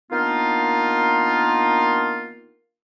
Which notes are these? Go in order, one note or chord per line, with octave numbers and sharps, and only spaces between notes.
D#3 A#3 B3 D4 D#4 F4